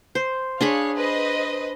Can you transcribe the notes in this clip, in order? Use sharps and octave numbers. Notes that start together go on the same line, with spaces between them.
C5
D4 G#4 C#5 F5 B5
B4 C5 D#5